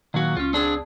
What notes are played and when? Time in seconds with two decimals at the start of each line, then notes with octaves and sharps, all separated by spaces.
0.14 A#2 D#3 F#3 F#4
0.37 C#2 C#4 F4
0.53 C4 D4 G#4